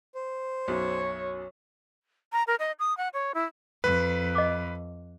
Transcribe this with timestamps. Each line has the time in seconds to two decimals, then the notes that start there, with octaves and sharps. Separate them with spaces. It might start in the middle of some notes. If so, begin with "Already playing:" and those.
0.15 C5
0.68 B1 F#2 C#5
2.33 A#5
2.47 A#4
2.59 D#5
2.79 D#6
2.97 F#5
3.14 C#5
3.34 E4
3.84 F2 B4
4.35 D#5 D6